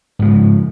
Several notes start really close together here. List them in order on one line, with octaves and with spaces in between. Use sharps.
G#2 F3 C#3